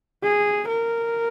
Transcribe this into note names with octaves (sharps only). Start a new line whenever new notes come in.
G#4
A#4